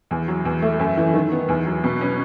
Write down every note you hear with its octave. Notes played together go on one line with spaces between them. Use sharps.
E2
F#3
E2
A3
F#2
E3
D#3
B3
E2
F#3
B2
C#4